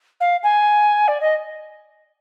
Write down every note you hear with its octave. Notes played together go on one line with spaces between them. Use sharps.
F5
G#5
D5
D#5